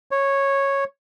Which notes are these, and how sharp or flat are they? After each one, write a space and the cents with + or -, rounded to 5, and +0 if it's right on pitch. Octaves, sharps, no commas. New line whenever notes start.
C#5 -10